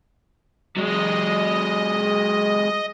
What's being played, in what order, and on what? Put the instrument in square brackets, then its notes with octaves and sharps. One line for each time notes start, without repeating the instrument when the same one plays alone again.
[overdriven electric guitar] F#3 G#3 [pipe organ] D#5